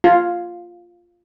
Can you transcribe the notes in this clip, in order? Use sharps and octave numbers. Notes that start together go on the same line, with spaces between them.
F4